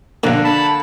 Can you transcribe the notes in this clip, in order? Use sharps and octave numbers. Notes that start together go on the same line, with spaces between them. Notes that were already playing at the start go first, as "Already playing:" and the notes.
A#1 A#2 D3 A#3 D4
A5 B5